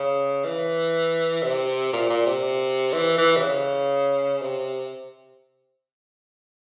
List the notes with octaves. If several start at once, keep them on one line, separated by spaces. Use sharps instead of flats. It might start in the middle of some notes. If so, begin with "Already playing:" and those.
Already playing: C#3
E3
C3
A#2
A#2
C3
E3
E3
C3
C#3
C3